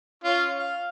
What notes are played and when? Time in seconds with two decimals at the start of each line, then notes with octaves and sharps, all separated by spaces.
0.24 C#4 F4
0.58 F5